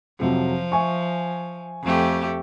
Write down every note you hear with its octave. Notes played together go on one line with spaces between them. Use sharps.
F2 C3 F3 F#3
E5 G#5 C#6
F2 A3 G4